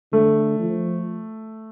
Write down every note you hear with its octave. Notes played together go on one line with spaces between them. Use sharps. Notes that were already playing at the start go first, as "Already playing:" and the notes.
D3 A3
F3